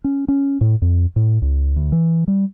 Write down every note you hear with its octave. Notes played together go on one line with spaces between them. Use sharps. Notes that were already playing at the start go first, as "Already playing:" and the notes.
C#4
C#4
A2
F2
A2
C#2
D2
E3
G3